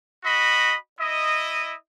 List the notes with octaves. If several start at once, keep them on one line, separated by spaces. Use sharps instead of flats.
F#4 D#5 B5
E4 D#5